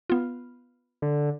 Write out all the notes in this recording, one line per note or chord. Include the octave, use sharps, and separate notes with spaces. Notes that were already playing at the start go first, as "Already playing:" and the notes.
B3 F4
D3